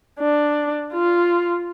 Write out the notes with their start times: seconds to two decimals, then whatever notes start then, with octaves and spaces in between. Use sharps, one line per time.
0.20 D4
0.93 F4